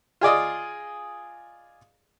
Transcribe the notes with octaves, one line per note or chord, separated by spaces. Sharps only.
F4 G#4 D5 D#5